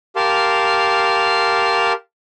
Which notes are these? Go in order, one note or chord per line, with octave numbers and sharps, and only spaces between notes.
G4 A#4 F5 A5 C6